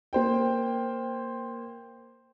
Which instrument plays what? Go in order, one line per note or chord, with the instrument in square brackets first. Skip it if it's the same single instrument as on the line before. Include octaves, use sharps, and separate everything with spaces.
[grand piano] A#3 C5 G5